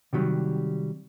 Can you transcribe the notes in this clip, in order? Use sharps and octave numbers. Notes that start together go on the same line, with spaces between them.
C3 D#3 F#3 G3